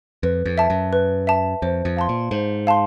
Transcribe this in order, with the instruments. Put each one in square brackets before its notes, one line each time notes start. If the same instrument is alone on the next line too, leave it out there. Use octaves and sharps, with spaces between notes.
[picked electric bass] F2 [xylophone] B4
[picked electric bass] F2
[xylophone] E5 A5
[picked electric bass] F#2
[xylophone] B4
E5 A5
[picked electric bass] F2 [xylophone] C5
[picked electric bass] F2
[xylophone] F5 A5 C6
[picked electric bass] A#2
[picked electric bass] G#2 [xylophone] C5
[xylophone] F5 A5 C6